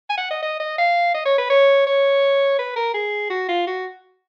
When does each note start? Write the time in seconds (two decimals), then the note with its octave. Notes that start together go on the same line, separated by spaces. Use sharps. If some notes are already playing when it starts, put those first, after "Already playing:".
0.09 G#5
0.17 F#5
0.31 D#5
0.42 D#5
0.60 D#5
0.78 F5
1.14 D#5
1.26 C#5
1.38 B4
1.50 C#5
1.86 C#5
2.59 B4
2.76 A#4
2.94 G#4
3.30 F#4
3.49 F4
3.67 F#4